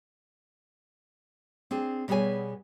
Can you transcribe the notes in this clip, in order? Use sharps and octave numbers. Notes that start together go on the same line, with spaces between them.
C4 D4 G#4
B2 G3 B3 G#4 C#5 G#5